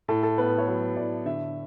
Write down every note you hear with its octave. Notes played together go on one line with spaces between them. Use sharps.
A2 A4
A4
B3 B4
C#5
F#3 B4
A2 D5
D3 E5